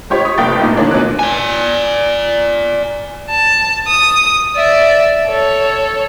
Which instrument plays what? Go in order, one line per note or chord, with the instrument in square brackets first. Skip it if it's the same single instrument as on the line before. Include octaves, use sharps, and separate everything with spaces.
[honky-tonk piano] G#1 F4 G4 C5 C#5
C#6 D#6 B6
G1 C2 A#3 G5 A6
A#2 D#4 F4
D#3 E3 A#3 C#4 D4
B2 C#4 D#4 F#6
[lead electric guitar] D5 G#5
[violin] A5
D#6
D5 E5
A4 C#5